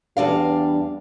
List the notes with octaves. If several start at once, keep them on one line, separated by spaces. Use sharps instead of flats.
E2 G3 D4 F5